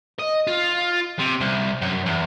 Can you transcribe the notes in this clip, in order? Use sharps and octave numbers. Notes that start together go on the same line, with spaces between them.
D#5
F4
C3
C2
F#2
E2